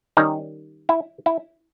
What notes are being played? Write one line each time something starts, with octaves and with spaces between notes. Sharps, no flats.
D#3 G3 C#4 D#4
E4
E4